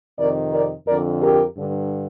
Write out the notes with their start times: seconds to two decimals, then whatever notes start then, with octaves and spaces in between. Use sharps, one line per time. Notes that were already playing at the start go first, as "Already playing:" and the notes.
0.19 F2 C3 D#3 A#4 D5
0.53 A#4 D5
0.88 F2 D3 A#4 D5
1.22 G4 A#4
1.56 G2 D3